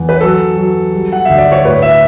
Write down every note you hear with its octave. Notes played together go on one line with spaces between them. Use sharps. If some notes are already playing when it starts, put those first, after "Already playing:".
Already playing: E2
B4
F#3 A4
F#3
G3
F#5
D2 E5
D5
C#5
A2 B4
E5